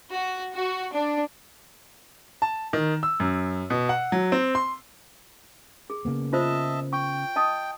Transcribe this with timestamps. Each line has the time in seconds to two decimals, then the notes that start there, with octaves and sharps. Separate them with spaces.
0.10 F#4
0.54 F#4
0.92 D4
2.42 A5
2.73 D#3
3.03 E6
3.20 F#2
3.70 B2
3.89 F#5
4.12 F#3
4.32 C4
4.55 C6
5.90 G#4
6.05 C#3 A#3 B3
6.33 F4 C5 D#5 E5 A5
6.93 G5 C#6
7.36 D#5 A5 D#6